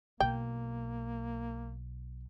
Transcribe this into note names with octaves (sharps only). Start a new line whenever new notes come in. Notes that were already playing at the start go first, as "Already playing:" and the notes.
B1 A#3 G5